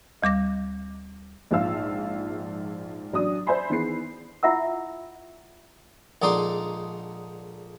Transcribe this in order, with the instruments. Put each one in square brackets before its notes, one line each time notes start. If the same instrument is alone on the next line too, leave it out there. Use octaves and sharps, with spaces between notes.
[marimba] D2 G3 D6 A#6
[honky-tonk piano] A#1 G#2 F3 E5 F5 E6
A1 F#3 D4 D#6
C5 D5 E5 G#5 B5 C6
D#3 E3 B3 E4 G#4 C7
[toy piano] E4 F4 E5 F#5 E6
[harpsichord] A#1 D3 G#3 D#4 D5 C6